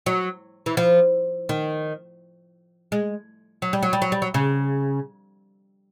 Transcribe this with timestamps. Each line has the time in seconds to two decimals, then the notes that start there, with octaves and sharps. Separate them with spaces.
0.06 F#3
0.66 E3
0.77 F3
1.49 D#3
2.92 G#3
3.62 F#3
3.73 G3
3.83 F#3
3.93 G3
4.02 F#3
4.12 G3
4.22 F#3
4.34 C#3